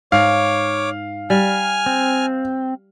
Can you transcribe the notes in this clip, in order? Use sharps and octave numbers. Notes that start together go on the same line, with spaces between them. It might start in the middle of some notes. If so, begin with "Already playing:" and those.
G#2 C#5 F5 D6
G3 G#5 F6
C4